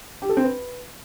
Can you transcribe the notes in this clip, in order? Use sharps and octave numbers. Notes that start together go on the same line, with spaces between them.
G4
A4
C4
B4